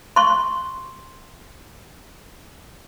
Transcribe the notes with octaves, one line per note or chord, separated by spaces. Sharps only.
C6 C#6